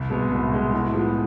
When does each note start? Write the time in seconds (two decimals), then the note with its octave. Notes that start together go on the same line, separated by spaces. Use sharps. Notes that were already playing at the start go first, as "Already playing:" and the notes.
Already playing: C2
0.10 B2 G#3 B3
0.31 C2
0.52 B2 G#3 B3
0.73 A2
0.94 F3 G#3 B3